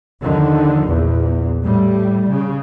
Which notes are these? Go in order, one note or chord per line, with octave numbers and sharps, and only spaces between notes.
D#2 D3 D#3 F3
A#1 E2 A#2
A2 G3
C#3